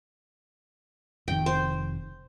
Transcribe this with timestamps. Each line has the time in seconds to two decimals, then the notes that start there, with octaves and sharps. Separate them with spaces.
1.28 F1 C3 D#3 G5
1.46 C5